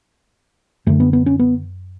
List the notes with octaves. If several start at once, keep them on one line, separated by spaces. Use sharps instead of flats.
F#2 D3 A3
B3
B3
C#4
B3